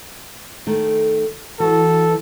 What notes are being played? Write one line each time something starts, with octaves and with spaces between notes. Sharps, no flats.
D#3 A3
E3 F#4 A4